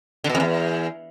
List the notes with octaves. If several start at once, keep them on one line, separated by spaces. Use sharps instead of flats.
D3
B2
F2
E2